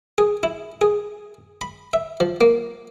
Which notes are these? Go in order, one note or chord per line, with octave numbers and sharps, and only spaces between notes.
G#4
E4
G#4
B5
E5
F3
A#3